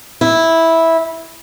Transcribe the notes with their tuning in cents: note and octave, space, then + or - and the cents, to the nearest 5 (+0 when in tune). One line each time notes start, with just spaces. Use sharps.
E4 -10